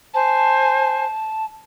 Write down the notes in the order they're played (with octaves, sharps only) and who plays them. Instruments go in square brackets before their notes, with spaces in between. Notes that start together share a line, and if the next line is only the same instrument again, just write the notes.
[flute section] C5 G#5 [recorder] A5